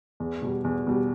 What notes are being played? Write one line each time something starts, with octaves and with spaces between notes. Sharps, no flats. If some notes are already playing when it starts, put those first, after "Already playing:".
E2
B2 G3
E2
B2 G3